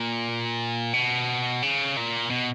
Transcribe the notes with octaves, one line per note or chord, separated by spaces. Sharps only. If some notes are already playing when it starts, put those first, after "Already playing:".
Already playing: A#2
B2
C#3
A#2
B2